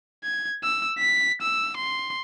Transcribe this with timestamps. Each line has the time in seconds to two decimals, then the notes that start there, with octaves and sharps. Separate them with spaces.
0.24 G#6
0.63 E6
0.99 B6
1.42 E6
1.77 C6